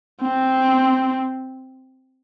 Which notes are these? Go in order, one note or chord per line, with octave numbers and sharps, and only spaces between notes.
C4